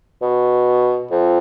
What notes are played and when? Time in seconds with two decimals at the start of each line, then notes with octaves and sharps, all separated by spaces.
0.22 B2
1.11 F2